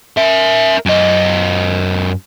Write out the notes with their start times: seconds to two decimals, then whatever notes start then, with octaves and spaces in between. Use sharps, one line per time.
0.18 A#4 E5
0.86 F#2 D#5